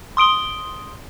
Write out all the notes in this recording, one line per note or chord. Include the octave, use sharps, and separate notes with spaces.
C6 D#6 D7 G7